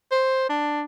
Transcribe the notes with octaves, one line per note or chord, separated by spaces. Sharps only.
C5
D4